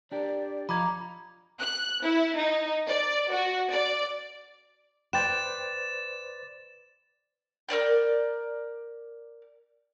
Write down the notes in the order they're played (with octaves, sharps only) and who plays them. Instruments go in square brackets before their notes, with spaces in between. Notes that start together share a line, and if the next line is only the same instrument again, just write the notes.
[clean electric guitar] D4 G4 A#4 [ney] D5
[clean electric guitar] F3 D#5 F5 [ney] A#5 [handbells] B5 D6 G#6
[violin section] F#6
E4
D#4
D5
F#4
D5
[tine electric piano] B4 C5 D5 [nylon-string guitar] G5 [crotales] A6 E7
[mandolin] A#4 C5 D5 G5